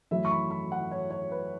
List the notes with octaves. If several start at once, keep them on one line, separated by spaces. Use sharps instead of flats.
F#2 E3 A3 E4 E5
C#6
B5
B5
F#5
C#5
C#5
B4